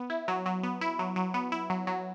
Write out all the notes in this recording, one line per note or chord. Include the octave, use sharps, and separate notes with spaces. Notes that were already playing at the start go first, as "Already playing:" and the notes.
Already playing: B3
E4
F#3
F#3
B3
E4
F#3
F#3
B3
E4
F#3
F#3